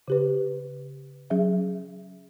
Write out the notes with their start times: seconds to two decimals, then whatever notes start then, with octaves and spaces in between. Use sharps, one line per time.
0.08 C#3 G4 B4
1.30 F#3 C#4 G#4 E5